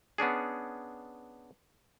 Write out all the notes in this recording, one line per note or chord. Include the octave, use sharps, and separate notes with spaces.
B3 C#4 D4 G#4